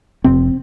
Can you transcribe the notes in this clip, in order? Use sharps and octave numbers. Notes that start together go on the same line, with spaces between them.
F1 F2 C3 C4